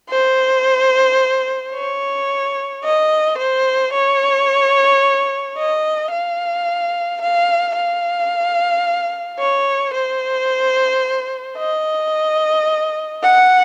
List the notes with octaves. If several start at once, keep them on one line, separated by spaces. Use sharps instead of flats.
C5
C#5
D#5
C5
C#5
D#5
F5
F5
F5
C#5
C5
D#5
F#5